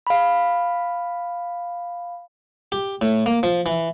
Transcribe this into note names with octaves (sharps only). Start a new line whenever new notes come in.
F5 B5
G4
A2
A#3
F3
E3